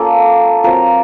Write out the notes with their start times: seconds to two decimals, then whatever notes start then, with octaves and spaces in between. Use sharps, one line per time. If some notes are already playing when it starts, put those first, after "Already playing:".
Already playing: A#3 C#4 F4 A4
0.64 F#3 C4 F4 A#4